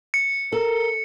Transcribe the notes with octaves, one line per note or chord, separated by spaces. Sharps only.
C#7
A4 A#4